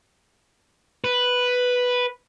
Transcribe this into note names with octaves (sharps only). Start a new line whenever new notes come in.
B4